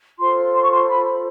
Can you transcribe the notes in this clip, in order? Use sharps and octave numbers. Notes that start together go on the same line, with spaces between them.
F4 A4 C5 C6
C6
C#6
C6
B5